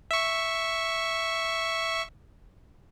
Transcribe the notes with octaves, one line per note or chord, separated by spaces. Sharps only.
E5 C#6